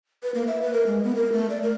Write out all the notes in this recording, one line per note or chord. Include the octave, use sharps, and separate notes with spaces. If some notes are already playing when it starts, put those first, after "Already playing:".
B4
A#3
E5
B4
A#4
G#3
B3
A#4
A3
D5
A#4